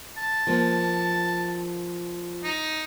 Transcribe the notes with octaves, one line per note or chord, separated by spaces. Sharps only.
A5
F3 A#3
D#4